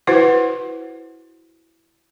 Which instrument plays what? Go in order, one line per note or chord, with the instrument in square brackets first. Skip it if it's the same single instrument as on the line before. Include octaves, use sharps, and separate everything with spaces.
[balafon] E4 F#4 B4 C5 F#5